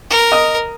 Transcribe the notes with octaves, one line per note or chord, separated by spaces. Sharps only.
A#4
D#5 D#6